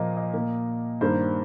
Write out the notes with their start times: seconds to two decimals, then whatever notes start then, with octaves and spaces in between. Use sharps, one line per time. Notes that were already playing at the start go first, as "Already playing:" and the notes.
Already playing: A#2 F3 A#3 D#5
0.17 D#5
0.34 A#2 A#3
1.01 G2 D#3 G3 A#3 C5